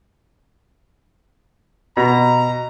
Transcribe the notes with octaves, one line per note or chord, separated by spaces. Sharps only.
B2 A#5